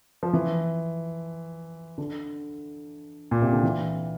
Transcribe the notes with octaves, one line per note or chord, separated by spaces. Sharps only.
F3
E3
D3
A#2
C3
D3
E3